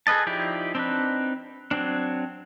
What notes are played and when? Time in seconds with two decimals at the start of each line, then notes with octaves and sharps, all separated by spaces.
0.07 G#4 A4 B4 D#5 A5
0.27 F3 D#4 E4 G4 D5
0.75 C4 D4 D#4 B4
1.71 F#3 C4 D4